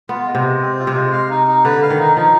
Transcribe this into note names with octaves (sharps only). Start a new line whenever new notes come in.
B3 F4
G#3
C3
G#3
C4
F4
C3
G#3
F5
D#4
D#4
D3 B4
F5
D#3
D#4
F3 D#4